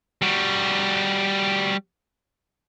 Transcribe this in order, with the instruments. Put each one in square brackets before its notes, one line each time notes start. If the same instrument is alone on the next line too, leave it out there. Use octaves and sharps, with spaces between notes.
[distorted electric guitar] G3 F#4